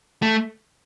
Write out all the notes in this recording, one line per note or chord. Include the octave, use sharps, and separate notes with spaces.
A3